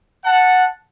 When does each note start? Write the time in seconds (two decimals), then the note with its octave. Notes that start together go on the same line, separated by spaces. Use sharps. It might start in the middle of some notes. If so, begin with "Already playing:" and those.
0.24 F#5 A5